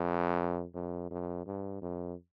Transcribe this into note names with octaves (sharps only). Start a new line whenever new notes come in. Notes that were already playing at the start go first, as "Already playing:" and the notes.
Already playing: F2
F2
F2
G2
F2